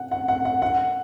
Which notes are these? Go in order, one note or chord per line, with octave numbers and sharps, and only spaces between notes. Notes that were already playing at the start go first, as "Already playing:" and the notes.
Already playing: F#5
F#5
F#5
F#5
F#5